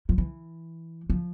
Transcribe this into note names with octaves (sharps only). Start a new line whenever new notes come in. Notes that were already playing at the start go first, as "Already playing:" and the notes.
F3
E3
F3